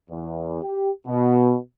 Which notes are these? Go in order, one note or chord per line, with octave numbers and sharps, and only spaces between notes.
E2
G4
B2